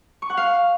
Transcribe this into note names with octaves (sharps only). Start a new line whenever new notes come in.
C#6
F#5
F5